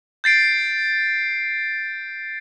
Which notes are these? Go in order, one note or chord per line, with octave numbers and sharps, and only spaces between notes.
G6 A6 C7 D7